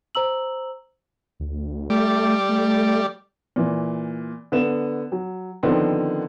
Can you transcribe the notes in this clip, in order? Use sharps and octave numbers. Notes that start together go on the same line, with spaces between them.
C5 A#5 E6 F#7
D2
G3 A3 D5
A3
A#2 E3
D3 B3 E7
F#3
D3 D#3 F3 B3 C4